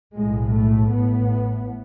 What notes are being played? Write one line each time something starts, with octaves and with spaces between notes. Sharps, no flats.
B1 A2 G#3
A3
A1 A2 B3